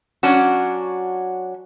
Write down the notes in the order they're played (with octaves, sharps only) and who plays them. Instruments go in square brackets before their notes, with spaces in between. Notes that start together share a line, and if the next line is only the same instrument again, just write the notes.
[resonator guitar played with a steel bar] F#3 C#4 D4 F#4